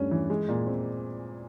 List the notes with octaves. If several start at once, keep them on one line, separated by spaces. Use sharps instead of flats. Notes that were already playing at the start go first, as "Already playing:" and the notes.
Already playing: G2 A3 C#4
E3
G#3
A#2
C4